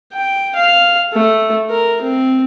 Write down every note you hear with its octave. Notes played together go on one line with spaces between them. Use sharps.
G5
F5
A3
A#4
C4